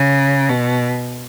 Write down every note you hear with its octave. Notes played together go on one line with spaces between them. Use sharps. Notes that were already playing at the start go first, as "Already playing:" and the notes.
Already playing: C#3
B2